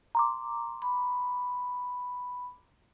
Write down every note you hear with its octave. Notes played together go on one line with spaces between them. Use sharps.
A#5 C6 D6
B5